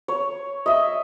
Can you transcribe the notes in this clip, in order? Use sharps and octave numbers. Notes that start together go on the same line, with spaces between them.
C#5
D#5 E5